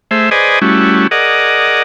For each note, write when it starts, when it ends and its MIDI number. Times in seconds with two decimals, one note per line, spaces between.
0.11 0.30 57
0.11 0.30 68
0.11 0.30 72
0.11 0.30 76
0.31 0.59 68
0.31 0.59 71
0.31 0.59 72
0.31 0.59 74
0.31 0.59 75
0.31 0.59 80
0.62 1.07 55
0.62 1.07 57
0.62 1.07 61
0.62 1.07 64
0.62 1.07 66
1.11 1.83 68
1.11 1.83 70
1.11 1.83 74
1.11 1.83 75
1.11 1.83 78